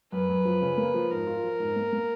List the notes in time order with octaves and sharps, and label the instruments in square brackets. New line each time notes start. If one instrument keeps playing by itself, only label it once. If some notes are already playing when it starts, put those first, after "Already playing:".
[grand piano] F#2 [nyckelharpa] B4
[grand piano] F#2
F3
C#3
A#3
F3
[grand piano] G#2 [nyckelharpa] A#4
[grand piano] F4
F3
G#2
A#3
A#3